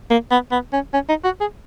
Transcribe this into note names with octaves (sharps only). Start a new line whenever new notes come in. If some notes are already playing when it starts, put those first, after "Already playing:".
A#3
B3
B3
C#4
C#4
D#4
F#4
G#4